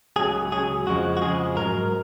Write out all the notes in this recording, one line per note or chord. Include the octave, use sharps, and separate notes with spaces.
C#2 C#3 F#3 G#4
C#2 C#3 F#3 G#4
F2 C#3 F3 G#3 F#4
F#4
F2 C#3 F3 G#3 G#4
G#2 F#3 A#4